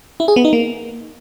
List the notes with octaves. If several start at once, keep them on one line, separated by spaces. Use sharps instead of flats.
E4
G#4
B3
D#4
A#3